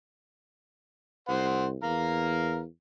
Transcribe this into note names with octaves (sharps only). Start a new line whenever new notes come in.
C2 C5 F#5
E2 A#4 F5